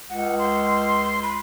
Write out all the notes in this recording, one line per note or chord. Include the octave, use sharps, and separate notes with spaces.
C#2 F#5
C6
B5